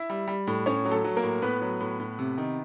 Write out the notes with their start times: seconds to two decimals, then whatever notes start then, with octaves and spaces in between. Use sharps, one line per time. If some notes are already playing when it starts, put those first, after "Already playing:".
Already playing: E4 E5
0.10 G3
0.28 G3
0.47 A2
0.66 A2 C#4 C#5
0.85 F#3
0.91 A3 A4
1.04 F#3
1.17 A#3 A#4
1.23 A2
1.42 A2 B3 B4
1.62 F#3
1.80 A2
2.00 A2
2.19 C3
2.38 D#3